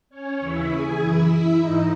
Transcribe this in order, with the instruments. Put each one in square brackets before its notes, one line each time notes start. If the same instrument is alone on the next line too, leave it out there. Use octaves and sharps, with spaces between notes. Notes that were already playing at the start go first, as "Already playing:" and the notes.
[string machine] C#4 C#5
D#2 C#3 E3 E4 E5
G#4 G#5
F#2 E3 E4 E5
E4 E5
G#2 E3 D#4 D#5